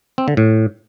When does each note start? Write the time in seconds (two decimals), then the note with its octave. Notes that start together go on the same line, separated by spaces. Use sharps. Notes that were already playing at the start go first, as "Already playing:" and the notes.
0.18 C4
0.28 D3
0.37 A2